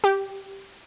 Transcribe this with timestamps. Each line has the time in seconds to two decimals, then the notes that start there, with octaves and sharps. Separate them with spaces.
0.04 G4